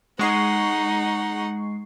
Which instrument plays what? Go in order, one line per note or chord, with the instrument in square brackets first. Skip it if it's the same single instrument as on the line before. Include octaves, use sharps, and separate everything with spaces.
[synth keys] G#3 C#6 C7 [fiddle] D#4 F#5